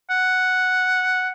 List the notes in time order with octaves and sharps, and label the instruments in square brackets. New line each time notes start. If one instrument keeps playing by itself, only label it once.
[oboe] F#5